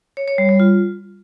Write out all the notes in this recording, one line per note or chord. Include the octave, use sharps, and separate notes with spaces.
C#5
C#5
G3
G3
F4